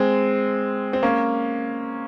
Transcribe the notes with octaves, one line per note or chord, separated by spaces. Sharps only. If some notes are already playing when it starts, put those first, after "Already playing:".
Already playing: G#3 C4
C4
A#3 C#4